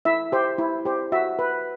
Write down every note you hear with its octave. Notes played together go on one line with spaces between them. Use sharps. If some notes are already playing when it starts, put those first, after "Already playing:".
E4 E5
G4 C5
E4
G4 C5
F#4 E5
B4